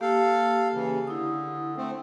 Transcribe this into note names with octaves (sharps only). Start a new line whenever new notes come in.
A#3 G4 A4 F5
C#3 E3
D3 E4 D#6
A3 C4